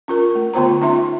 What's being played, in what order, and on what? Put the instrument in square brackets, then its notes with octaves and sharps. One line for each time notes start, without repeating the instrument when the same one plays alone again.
[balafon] C#4 F4 A#4
A3
D3 B3 F4 C5 A#5
C#4 D#4 F4 E5 C6